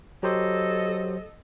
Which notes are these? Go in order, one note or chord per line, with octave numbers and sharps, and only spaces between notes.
F#3 G4 A4 C5 D#5